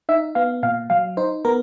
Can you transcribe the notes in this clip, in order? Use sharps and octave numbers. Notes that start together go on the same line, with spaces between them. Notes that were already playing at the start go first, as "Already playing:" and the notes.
D#4 E5
B3 F5
A#2 F5
F#3 F5
D#4 C5
B3 A#4